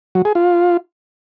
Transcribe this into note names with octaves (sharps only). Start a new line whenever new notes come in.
F#3
G#4
F4